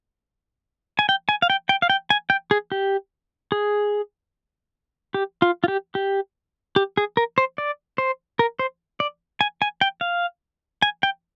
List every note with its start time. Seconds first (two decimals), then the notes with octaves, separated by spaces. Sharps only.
0.99 G#5
1.09 G5
1.29 G#5
1.42 F5
1.50 G5
1.69 G5
1.82 F5
1.90 G5
2.10 G#5
2.30 G5
2.51 G#4
2.72 G4
3.52 G#4
5.14 G4
5.42 F4
5.64 F4
5.68 G4
5.95 G4
6.76 G4
6.97 G#4
7.17 A#4
7.38 C5
7.58 D5
7.98 C5
8.39 A#4
8.59 C5
9.00 D5
9.41 G#5
9.62 G#5
9.81 G5
10.01 F5
10.82 G#5
11.03 G5